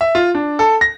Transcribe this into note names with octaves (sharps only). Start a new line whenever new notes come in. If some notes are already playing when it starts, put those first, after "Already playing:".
E5
F4
D4
A4
A#6